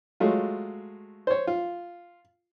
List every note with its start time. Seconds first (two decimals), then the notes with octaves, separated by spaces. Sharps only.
0.20 F#3 G#3 A3 F4
1.27 C5 C#5
1.47 F4